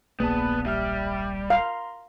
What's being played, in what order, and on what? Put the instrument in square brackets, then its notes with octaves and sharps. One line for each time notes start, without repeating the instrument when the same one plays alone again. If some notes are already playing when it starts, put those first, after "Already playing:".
[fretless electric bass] D1 A#1 A#3 [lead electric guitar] B3 [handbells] G#4 D5 A5
[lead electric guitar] G3 [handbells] E5 F6
[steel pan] F5 [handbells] A#5 C6